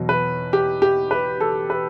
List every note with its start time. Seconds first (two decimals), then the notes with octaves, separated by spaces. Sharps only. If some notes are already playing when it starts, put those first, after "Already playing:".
Already playing: E2 B2 F#3
0.09 B4
0.53 G4
0.82 G4
1.11 B4
1.40 A4
1.70 B4